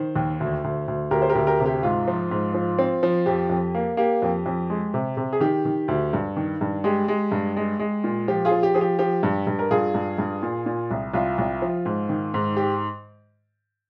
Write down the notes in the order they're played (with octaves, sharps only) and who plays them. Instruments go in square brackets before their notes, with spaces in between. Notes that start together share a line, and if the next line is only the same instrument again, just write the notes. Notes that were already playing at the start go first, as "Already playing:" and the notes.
Already playing: [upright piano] D#3 C5
D#2
D2
D2
D2
D2 G4 A#4
C5
G4 A#4
D2
G4 A#4
C3
G4
G#2 F4
F3
G#2
F3
C4
F3
F2 G4
F2
A#3
A#3 G4
F2
F2
G#3
C3
C3
G#4
D#3 G4
D#3
D2
G2
D#3
G2
G#3 G4
G#3
G2
G#3
G#3
A#2
F3 G4
F4 G#4
F3
G4
F3 G#4
G4
F3 G4
G2
G2
A#4
G2 F4 G#4
G2
G2
A#2
A#2
C2
C2 F4
C2
F3
G#2
D#3
G#2
G4